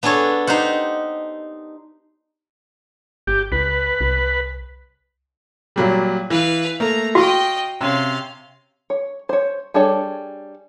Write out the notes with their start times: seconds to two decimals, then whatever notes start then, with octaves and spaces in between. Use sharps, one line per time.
0.03 B3 D4 G#4 A4 C#5
0.47 D#4 G4 C5 F#5
3.27 G1 G4
3.52 C#2 B4
4.01 C2
5.76 A#2 F#3 G3
6.30 E3 B4 F5
6.80 A3 A#3 A#5
7.15 F#4 D#5 F5 G5 C#6
7.81 C3 C#4 F5 C6
8.90 C#5
9.29 C5 C#5
9.74 G3 D4 G#4 A4 C#5